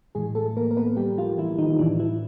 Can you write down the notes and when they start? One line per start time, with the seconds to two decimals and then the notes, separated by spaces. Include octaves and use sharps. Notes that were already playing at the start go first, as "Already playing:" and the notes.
0.15 A2 E3 G#3 G#4
0.35 A3 A4
0.57 A#3 A#4
0.71 A#4
0.77 B3 B4
0.97 G3 G4
1.18 F3 F4
1.38 E3 E4
1.58 D#3 D#4
1.79 A2 E3 D4
1.99 E3 E4